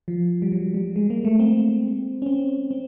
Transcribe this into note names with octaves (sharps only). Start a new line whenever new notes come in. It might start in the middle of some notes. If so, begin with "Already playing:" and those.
F3
G3
F#3
G3
G#3
A#3
A3
C4
C#4
C4
C4